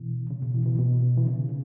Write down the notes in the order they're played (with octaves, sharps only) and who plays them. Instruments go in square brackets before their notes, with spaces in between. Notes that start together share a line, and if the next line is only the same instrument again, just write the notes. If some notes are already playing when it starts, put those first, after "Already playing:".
Already playing: [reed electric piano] B2 E3
C#3
B2
B2 E3
B2 E3
B2
B2
E3
C#3